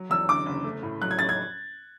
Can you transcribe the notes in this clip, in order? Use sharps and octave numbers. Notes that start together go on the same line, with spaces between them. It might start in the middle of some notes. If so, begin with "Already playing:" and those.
Already playing: F#3
E2 E6
D3 D6
F#1
A3
A2
F#3 F#6
G#6
A1 A6
G#6